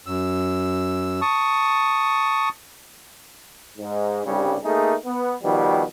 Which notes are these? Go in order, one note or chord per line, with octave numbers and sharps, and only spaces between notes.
F#2 E6
A5 C#6 D#6
G#2
C2 G2 C#3 G3
A3 A#3 D#4 G#4
B3
B2 D#3 F3 G3